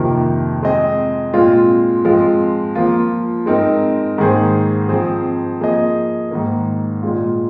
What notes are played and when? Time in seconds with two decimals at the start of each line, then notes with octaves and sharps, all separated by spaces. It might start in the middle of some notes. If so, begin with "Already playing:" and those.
Already playing: F2 C3 D#3 A#3
0.62 G#3 C4 G#4 D#5
1.34 A#2 G#3 C4 F4
2.05 F3 G#3 C4 F4
2.75 F3 A#3 F4
3.46 G#3 C4 D#4 A#4
4.18 G#2 D#3 A#3 G#4 C5
4.89 F3 C4 G#4 C5
5.60 F3 A#3 G#4 D#5
6.31 G#2 D#3 A#3
7.02 A#2 G#3 F4